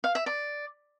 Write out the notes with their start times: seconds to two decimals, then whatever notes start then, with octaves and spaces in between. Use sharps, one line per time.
0.04 F5
0.15 E5
0.26 D5